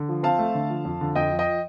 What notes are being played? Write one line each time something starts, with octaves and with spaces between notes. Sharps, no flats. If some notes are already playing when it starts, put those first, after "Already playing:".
Already playing: D3
F3
C4 F5 A5
A3
D3
F3
F2
D3
F2 D#5 G5
F3
D#5 G5